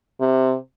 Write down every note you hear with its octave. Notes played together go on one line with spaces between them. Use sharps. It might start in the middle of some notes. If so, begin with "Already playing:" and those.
C3